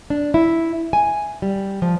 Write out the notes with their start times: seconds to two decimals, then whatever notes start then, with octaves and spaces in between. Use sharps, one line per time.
0.10 D4
0.34 E4
0.93 G#5
1.42 G3
1.82 F3